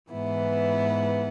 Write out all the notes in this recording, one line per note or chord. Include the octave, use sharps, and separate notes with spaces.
G#2 E3 B3 E4